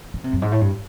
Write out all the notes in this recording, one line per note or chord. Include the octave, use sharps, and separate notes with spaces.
C#3
C3
F#2
G#2
A2
G2